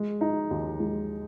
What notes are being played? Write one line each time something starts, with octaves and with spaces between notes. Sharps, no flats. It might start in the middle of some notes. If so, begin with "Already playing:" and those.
Already playing: G#3
D#4
D#2
G#3